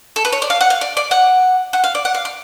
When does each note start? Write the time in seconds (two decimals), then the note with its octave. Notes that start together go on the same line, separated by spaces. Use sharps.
0.16 A4
0.25 B4
0.32 C#5
0.42 D5
0.50 F5
0.61 F#5
0.70 F5
0.81 D5
0.97 D5
1.11 F#5
1.73 F#5
1.84 F5
1.95 D5
2.05 F#5
2.15 F5
2.25 D5